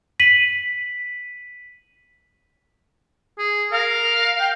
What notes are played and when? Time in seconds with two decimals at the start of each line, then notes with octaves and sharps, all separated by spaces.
0.20 B6 D#7 F#7
3.38 G#4
3.72 A#4 F5
4.40 G5